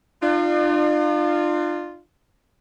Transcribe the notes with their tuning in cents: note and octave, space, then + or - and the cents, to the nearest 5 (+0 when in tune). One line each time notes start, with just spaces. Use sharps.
D4 +45 F4 -5